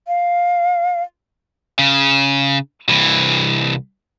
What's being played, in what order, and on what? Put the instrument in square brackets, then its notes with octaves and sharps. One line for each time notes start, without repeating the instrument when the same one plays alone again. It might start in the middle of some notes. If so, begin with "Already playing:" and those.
[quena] F5
[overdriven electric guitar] C#3
C2 E3